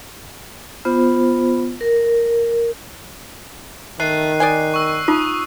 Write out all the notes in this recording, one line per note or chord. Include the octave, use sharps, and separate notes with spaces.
B3 F4 C5
A#4
D#3 A3 F#6 C7 D#7
D5 D#5 G#5
C#6 E6
D#4 F4 D#6